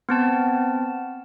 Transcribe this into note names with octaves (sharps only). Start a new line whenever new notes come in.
B3 C4 A5